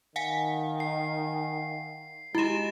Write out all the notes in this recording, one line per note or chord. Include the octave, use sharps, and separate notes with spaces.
D#3 F5 F#5 G#5
C7
G#3 E4 F#4 G4 A6 E7